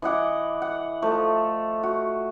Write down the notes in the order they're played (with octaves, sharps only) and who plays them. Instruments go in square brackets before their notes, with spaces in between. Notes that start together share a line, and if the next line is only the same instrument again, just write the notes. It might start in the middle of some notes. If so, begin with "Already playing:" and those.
[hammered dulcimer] E3 D#5 F#5 D6
F#5
F3 A3
F#4